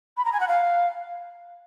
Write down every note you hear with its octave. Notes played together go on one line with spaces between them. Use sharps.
B5
A#5
G#5
F#5
F5